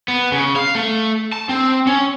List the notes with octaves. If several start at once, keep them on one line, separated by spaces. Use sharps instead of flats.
B3
C#3
F5
A3
A5
C4
C#4